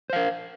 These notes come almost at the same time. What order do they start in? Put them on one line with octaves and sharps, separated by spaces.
C5 F5 A#4